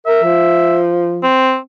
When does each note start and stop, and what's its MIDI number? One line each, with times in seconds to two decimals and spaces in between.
0.06 0.21 70
0.06 0.78 76
0.23 1.29 53
1.23 1.57 60